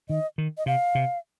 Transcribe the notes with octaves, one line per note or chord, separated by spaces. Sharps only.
D#3 D#5
D#3
D#5
C3 F5
C3